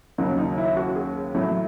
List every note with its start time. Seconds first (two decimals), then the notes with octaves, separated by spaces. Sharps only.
0.18 D#2 C#3 F#3 D#4
0.38 D#4
0.58 E4
0.77 F#4
0.96 G#4
1.35 A1 A2 F#3 A3